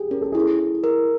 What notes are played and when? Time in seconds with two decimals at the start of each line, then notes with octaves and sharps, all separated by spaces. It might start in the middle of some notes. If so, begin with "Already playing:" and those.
Already playing: G4 G#4
0.10 C#4 A#4
0.22 A4
0.32 E4 G#4
0.43 A4
0.59 E4
0.84 A#4